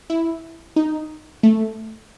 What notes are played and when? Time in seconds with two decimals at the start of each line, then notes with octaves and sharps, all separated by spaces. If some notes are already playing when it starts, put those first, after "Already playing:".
0.10 E4
0.76 D#4
1.43 A3